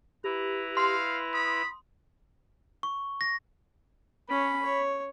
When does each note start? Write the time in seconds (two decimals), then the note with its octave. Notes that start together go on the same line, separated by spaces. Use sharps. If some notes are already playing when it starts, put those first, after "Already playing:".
0.24 E4 G4 B4 A#5
0.77 F5 C6
1.34 B5 D#6
2.83 C#6
3.21 A#6
4.30 C#4 C#5 B5
4.62 C#5